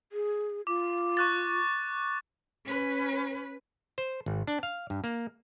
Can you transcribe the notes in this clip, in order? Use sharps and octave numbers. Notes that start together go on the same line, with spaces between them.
G#4
F4 D6
C#6 F#6 A6
C#4 B4
C5
G#1
D4
F5
G2
A#3